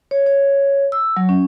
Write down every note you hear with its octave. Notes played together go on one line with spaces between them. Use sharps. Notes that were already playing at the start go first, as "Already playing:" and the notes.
C#5
C#5
E6
F#3
C#4